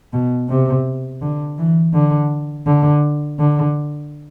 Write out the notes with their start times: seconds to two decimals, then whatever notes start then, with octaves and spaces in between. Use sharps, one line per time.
0.13 B2
0.49 C3
1.21 D3
1.58 E3
1.93 D3
2.66 D3
3.39 D3